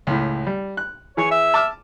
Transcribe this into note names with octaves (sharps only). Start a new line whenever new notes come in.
C#2 A2
G3
F#6
E3 G#4 C#5 G#5
E5
A5 D6 F6